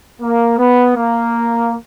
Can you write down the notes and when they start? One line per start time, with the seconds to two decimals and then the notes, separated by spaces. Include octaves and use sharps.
0.21 A#3
0.59 B3
0.96 A#3